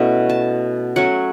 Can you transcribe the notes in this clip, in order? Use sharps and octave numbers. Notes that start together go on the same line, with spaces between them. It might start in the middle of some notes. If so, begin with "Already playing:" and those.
Already playing: B2 A3 C#4 E4
A5
F#3 A3 C#4 F#5